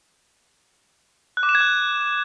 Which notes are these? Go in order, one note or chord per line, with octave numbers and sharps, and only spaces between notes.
F#6
D6
E7
G#6
F#6